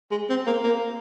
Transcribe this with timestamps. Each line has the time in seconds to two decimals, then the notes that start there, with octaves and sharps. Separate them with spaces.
0.11 G#3
0.29 C4
0.46 A#3
0.63 A#3